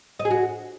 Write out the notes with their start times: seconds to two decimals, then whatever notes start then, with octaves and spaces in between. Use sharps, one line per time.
0.19 D#5
0.25 G#4
0.30 F#4